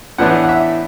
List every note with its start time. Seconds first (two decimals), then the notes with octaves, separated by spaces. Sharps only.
0.18 A2 E3 B3 D4 F#5
0.44 F#5
0.49 E5